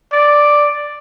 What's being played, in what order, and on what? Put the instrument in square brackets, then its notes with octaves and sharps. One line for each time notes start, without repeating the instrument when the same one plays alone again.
[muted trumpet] D5